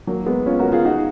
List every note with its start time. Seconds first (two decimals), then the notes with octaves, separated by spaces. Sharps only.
0.07 F#3 A#3
0.26 G#3 B3
0.46 C#4 F4
0.59 F#4 A#4
0.72 F4 G#4
0.85 D#4 F#4